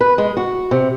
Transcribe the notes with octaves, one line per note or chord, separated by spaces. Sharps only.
B4
G#3
F#4
C3